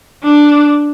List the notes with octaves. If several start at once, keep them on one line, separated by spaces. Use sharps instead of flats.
D4